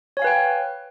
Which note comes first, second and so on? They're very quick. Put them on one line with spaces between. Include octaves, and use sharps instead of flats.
C#5 G#5 F5 B4 G5